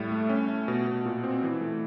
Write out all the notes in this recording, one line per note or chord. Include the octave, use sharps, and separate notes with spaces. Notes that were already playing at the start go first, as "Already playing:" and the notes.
Already playing: A2 G3
A3
C#4
A3
B2
B2
A#2
C4
E3
A3